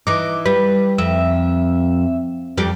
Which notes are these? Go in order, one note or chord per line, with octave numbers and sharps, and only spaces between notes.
E3 D#4 D6
G3 B4
F2 E5
F2 G3 D5